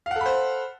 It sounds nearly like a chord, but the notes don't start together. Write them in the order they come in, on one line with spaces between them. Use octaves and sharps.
F5 F#5 A4 B5 C5